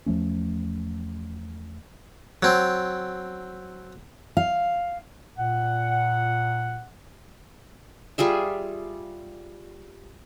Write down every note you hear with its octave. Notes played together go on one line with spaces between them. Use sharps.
E2 F3 A3 C#4
F#3 C4
F5
A#2 F#5
G3 F4 G#4 E5